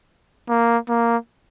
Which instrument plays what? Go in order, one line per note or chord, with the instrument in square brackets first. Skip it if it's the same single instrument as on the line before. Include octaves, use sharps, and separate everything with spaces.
[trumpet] A#3
A#3